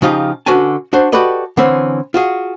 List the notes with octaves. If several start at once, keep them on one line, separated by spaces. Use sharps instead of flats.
C#3 F3 D#4 F4 G4
D3 C#4 F#4 B4 G#5 A5
D4 F#4 C5
F#4 G4 A4 B4 D5 D#5
D3 E3 C4 C#4
F4 F#4 G#4